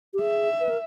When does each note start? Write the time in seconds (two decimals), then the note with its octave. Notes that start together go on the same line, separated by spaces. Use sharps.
0.14 G4
0.20 G#4 E5
0.60 B4
0.69 A#4